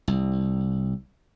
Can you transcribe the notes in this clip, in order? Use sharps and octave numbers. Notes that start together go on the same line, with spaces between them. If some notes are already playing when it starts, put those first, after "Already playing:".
C2